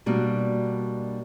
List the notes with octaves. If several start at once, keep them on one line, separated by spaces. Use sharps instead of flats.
B2 G3 A#3 D4 F#4